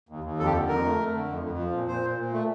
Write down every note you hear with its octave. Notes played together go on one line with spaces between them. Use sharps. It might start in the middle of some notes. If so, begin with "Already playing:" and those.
D#2
D#2
F2 A4
G4
D3 A4
F2 A#4
A3
A3
D3
F2
F2
F3
A#2
A#2 C5
A#2
A#2
A3